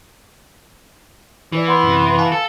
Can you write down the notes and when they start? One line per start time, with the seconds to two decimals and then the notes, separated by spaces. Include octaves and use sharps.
1.52 E3 E4 B4 D5
1.68 B3 C6
1.83 F#2 C3
2.19 F5 G#5 A5
2.32 A4